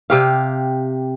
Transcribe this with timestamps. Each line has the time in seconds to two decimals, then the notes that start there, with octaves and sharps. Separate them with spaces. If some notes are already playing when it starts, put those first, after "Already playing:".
0.10 C3 G4 F5